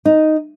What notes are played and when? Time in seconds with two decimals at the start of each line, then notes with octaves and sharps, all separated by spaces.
0.05 D#4